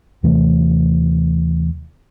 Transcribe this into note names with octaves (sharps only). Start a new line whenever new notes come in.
D#2 C3 E3 A3